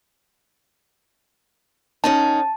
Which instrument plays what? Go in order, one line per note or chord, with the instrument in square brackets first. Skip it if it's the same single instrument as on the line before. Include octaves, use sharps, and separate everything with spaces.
[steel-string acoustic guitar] D#3 C#4 D#4 [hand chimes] A5